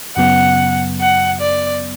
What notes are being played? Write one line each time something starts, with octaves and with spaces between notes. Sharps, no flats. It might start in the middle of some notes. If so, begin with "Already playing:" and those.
F#2 C#3 F#3 B3 F#5
F#5
D5